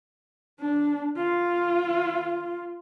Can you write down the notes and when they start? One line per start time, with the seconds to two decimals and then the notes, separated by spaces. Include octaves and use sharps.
0.60 D4
1.17 F4